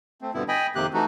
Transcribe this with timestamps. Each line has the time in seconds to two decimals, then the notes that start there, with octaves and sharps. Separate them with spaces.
0.22 A3 C4
0.34 G2 B2 D3 B3 E4
0.48 D#5 G5 G#5 B5
0.75 F2 C3 D#3 A#3 G4 F#6
0.93 E3 A3 D#4 F#4